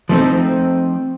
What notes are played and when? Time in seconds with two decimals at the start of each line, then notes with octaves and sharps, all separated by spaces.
0.09 F3 A3 C4 D#4